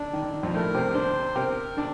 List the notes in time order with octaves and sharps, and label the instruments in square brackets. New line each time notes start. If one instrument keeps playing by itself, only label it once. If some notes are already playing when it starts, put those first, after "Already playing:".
Already playing: [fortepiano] D3 [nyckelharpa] D4
[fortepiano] D#3
D3
D#3
F2 F3
[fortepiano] A2 A3 [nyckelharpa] A#4
[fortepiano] C3 C4
[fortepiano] D3 D4 [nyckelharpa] C5
[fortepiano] C3 C4 [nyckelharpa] A#4
[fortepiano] D3 D4